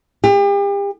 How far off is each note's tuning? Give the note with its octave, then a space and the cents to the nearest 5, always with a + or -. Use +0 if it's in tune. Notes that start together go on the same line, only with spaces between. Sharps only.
G4 +40